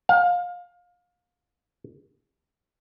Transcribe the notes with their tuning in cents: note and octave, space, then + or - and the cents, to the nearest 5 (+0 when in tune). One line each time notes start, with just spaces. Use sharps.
F5 +25